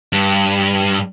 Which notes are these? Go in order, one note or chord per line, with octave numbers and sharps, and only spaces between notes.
G2